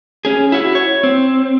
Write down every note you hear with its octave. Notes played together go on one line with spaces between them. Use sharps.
C#4 G#4
E4 F#4
C#5
C4